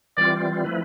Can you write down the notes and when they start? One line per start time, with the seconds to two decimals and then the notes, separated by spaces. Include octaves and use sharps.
0.17 E3 G3 C4 F4 D5
0.64 F3 A3 E4 B4